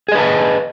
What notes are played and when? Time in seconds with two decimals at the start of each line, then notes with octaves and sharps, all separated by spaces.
0.08 G#4
0.12 D#5
0.15 B4
0.18 A5